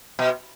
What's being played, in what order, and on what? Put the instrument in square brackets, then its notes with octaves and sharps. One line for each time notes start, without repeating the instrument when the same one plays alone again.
[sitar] B2